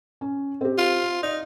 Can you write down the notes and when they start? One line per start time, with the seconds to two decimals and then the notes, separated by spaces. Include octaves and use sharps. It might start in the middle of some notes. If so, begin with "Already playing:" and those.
0.21 C#4
0.61 C4 G4
0.78 F4
1.23 D#4 D5